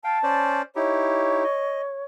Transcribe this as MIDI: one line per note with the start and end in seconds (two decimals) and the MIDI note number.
0.04 0.19 77
0.04 0.19 79
0.04 0.60 81
0.23 0.62 61
0.23 0.62 72
0.23 0.62 74
0.76 1.44 63
0.76 1.44 64
0.76 1.44 67
0.76 2.05 73
1.44 1.82 75